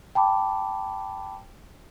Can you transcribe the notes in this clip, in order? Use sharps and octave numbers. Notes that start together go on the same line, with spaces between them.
G5 A5 B5 D6